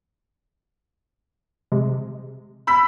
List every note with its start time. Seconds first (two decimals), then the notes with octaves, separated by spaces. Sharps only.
1.72 C3 G#3
2.67 B5 E6 B6